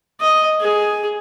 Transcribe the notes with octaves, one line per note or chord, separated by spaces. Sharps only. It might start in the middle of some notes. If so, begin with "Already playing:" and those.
D#5
G#4